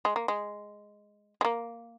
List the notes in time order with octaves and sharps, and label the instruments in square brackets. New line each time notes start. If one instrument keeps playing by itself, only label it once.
[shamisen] G#3
A#3
G#3
G#3
A#3